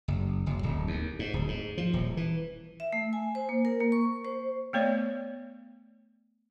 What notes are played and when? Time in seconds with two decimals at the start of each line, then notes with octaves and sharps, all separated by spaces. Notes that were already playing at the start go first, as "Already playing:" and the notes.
0.08 F#1
0.46 F#1
0.63 D1
0.87 D#2
1.19 G#2
1.33 D1
1.48 G#2
1.78 F3
1.93 D#1
2.17 E3
2.80 E5
2.93 A3
3.13 G#5
3.35 C5
3.49 A#3
3.65 A#4
3.80 A#3
3.92 C#6
4.25 C5
4.73 A3 B3 C#5 D5